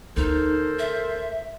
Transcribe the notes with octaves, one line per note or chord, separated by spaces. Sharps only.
D2 D#4 E4 A4 A#4 C5
E5